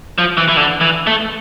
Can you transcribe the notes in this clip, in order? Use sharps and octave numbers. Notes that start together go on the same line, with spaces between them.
F3
E3
E3
D3
E3
A3